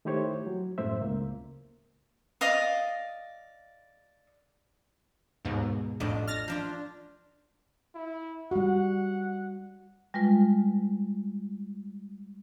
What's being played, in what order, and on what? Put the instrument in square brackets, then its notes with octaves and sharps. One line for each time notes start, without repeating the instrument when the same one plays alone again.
[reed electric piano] D#3 A3 E4 G4 C5 C#5
F#3
F#2 A2 C5 E5
C#2 A#3
[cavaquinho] D5 D#5 F5 D#6
[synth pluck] D#2 G#2 B2
[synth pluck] A1 F2 A2 [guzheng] D4 D#5
[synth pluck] F6 A6 A#6
[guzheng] F3 D4 F4
[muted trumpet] E4
[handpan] G3 F#4 [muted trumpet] F#5
[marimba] G3 G#3 F4 B4